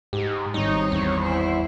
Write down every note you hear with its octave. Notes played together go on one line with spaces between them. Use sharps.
G#2 G4
G#1 G3 C4 D#4 C#5
E2
E4 C5